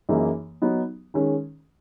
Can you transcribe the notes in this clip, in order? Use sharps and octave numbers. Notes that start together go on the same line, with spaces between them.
F#2 E3 A#3 D#4 G#4
F#3 B3 D#4
D#3 G#3 C#4